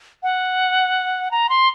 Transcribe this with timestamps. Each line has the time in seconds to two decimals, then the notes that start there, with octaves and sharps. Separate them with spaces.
0.23 F#5
1.31 A#5
1.49 C6